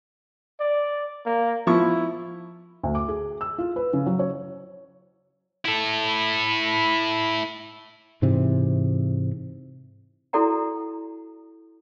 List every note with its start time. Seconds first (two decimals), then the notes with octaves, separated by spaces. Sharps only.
0.60 D5
1.26 A#3
1.67 F3 E4 C#6
2.83 D2
2.95 D6
3.09 G#4
3.41 E6
3.58 F4
3.76 B4
3.93 C#3
4.06 F#3
4.19 C#5
5.65 E4 A4
8.22 G#2 C3 E3
10.33 E4 F#4 A4 D5 F#5 A#5